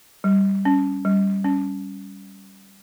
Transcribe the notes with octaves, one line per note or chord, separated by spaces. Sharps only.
G3
C#4
G3
C#4